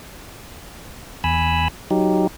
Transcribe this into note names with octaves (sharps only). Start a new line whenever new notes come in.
E2 G#5 B5 E6
F#3 D#4 G4